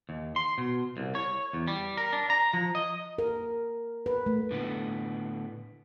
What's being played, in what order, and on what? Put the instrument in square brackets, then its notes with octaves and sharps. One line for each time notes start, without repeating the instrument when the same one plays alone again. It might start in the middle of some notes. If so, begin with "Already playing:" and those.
[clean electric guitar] D#2
C6
B2
C2
C#5
E2
G3
A#4
D4
A#5
F3
D#5
[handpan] A#4
B4
A3
[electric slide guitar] A2 D3 B3